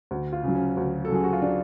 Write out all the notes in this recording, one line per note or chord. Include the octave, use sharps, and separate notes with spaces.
D2
F4
C#3 F#3
C#4
D2
A4
C#3 F#3 G#4
F#4
F4
D4